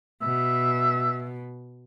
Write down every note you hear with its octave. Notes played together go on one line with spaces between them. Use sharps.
B2 E5